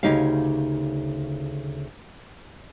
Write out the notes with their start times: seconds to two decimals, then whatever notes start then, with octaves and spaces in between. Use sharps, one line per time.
0.03 D2 C#3 D#4 G4 C#5 F5